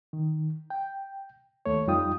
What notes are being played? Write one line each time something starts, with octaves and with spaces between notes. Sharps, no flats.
D#3
G5
D#2 A3 C#5
F2 G3 D#4 F4 G5 D#6